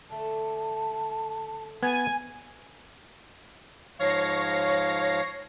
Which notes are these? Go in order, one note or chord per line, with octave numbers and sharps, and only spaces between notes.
D3 A3 A4 A5
B3 G#5
G#2 F3 C#5 F5 A#6 C7